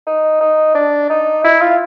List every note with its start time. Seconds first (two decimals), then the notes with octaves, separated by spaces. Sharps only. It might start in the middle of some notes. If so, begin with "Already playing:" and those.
0.07 D#4
0.41 D#4
0.75 D4
1.10 D#4
1.44 E4
1.61 F4